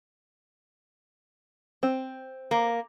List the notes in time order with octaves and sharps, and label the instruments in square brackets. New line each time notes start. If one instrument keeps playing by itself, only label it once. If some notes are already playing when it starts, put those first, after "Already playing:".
[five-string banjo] C4
[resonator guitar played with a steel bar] A#3